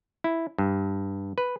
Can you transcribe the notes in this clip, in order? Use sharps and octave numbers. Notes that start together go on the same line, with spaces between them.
E4
G2
B4